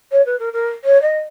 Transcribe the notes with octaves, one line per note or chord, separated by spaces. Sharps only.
C#5
B4
A#4
A#4
C#5
D#5